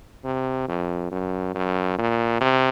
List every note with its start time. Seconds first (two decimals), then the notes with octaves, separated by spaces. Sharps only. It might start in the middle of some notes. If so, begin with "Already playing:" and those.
0.24 C3
0.68 F2
1.12 F#2
1.55 F#2
1.98 A#2
2.41 C3